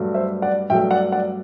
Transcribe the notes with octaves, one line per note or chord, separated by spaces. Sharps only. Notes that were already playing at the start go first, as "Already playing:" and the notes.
Already playing: G2 F#3 A3
C5 E5
D5 F#5
G2 F#3 A3 E5 G5
D5 F#5
D5 F#5